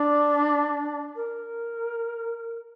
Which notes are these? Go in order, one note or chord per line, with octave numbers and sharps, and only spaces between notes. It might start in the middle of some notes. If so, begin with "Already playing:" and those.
Already playing: D4
A#4